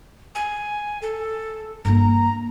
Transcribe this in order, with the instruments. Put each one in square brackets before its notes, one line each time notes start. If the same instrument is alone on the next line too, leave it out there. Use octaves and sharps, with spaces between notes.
[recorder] G#5
A4
[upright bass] G2 A#3 [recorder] A#5